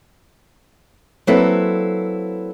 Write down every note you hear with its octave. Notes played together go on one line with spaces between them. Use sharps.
F#3 A#3 C4 E4 A4 B4